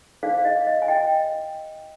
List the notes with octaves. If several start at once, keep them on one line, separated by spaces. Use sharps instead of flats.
D#4 G#4 C5 D5 F5
F5
D#5
D#5
G#5
D#5 G5